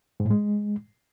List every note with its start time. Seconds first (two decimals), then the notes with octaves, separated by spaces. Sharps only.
0.20 G#2
0.25 A2
0.30 G#3